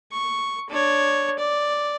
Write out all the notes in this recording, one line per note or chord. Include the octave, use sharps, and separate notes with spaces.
C#6
D4 C#5
D5